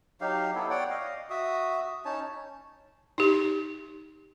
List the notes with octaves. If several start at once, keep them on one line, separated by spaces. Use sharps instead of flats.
F#3 D#4 G4 F5
B3 E4 A4
C#5 D5 F#5 G5
D#5 F5
F#4 E5 D#6
C#4 D#4 C#5 A5
D#4 G4